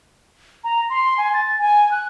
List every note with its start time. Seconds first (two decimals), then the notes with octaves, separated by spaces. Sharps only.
0.64 A#5
0.90 C6
1.18 G#5
1.34 A6
1.59 G#5
1.91 F#6